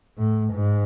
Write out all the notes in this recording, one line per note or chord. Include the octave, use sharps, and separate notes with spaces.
A2
G#2